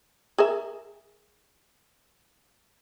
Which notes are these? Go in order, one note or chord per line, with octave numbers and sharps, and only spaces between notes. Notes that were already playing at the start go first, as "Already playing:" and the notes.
G#4 A#4 E5